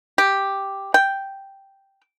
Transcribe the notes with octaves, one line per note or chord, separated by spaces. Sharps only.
G4
G5